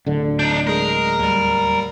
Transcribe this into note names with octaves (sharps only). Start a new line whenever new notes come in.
D1 D3
D4 D#4 G6
G#3 G#4 A#4
D#2 G3